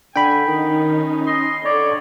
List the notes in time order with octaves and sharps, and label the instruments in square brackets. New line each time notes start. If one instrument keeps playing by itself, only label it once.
[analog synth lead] D3 [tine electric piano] G5 B5 [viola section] G#5
[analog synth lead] D#3 [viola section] C#4 D#4
[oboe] D#5 [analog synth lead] C6
[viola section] D3 [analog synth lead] C#5 [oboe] D5